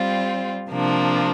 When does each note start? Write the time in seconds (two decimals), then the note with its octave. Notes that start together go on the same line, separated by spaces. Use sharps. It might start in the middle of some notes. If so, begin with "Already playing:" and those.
Already playing: G3 C4 F4
0.69 C3 F3 A#3 D4